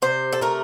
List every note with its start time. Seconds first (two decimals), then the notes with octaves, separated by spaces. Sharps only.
0.02 C3 C5
0.33 A4
0.41 A3 A#4